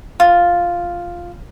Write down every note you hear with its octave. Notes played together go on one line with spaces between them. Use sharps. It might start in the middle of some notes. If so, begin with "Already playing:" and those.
F4